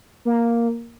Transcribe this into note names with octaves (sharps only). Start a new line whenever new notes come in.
A#3